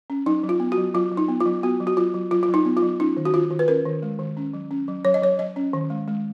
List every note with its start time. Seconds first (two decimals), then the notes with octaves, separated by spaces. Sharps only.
0.10 C#4
0.26 F#3 D#4
0.44 F#3
0.49 F4
0.60 B3
0.72 F#4
0.78 F#3
0.94 F#3 F4
1.11 F#3
1.17 D#4
1.28 B3
1.40 F#3 F4
1.63 B3 F#4
1.80 F#3
1.87 F#4
1.97 F#3 F4
2.14 F#3
2.31 F#3 F4
2.43 F4
2.48 F#3
2.54 D#4
2.65 B3
2.77 F4
2.82 F#3
3.00 C#4 D#4
3.17 D#3
3.25 F#4
3.34 D#3 F4
3.51 D#3
3.59 B4
3.68 C#4 A#4
3.85 D#3
4.02 G#3
4.19 D#3
4.37 C#4
4.53 F#3
4.71 C#4
4.88 F#3
5.05 F#3 C#5
5.14 D#5
5.22 F#3 C#5
5.39 F#3 D#5
5.56 C#4
5.73 D#3
5.90 G#3
6.08 G#3